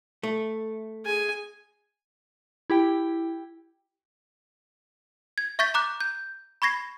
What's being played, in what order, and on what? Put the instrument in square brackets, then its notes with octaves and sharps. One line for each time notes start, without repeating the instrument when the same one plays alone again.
[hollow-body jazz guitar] A3
[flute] G#4 [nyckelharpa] G#5
[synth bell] E4 G4 G5
[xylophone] G#6
E5 C#6 G6 A6 B6
A#5 D6 F#6
G6
B5 C#6 G#6 A#6 C7